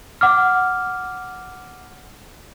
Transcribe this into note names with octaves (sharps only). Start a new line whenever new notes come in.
F#5 D6 F6